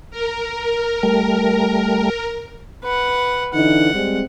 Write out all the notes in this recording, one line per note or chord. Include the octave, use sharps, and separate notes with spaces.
A#4
G3 A3
B4 F#5
D3 E3 D#4 F#5
G3 G#3 C4